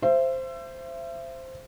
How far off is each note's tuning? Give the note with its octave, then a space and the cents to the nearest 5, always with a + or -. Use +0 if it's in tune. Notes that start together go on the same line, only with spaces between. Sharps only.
C5 +0 E5 +35